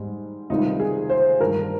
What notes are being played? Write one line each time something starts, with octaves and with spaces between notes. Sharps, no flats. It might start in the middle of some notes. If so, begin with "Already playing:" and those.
Already playing: G#2 G3 G#3
C#2 C3 D#3 G3 D#4
G#4
C5
G2 D#3 G3 A#4